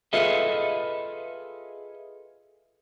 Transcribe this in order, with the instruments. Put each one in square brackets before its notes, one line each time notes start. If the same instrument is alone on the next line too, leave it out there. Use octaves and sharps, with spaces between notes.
[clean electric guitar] F4 G#4 A4 B4 D#5 E5